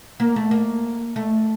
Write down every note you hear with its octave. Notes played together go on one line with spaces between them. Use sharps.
A#3
A3
A#3
A3